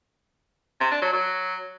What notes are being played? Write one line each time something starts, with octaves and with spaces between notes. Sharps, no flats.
C3
D4
F#3
F#3